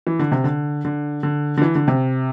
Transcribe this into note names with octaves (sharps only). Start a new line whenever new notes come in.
E3
D3
C3
D3
D3
D3
D3
E3
D3
C3